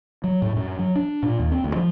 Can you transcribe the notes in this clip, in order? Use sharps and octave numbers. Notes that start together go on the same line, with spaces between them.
F#3
A2
F#2
F#3
D4
A#2
D#2
C4
D2
F3